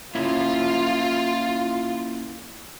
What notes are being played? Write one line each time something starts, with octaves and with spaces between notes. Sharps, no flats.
A#3 C#4 E4 F4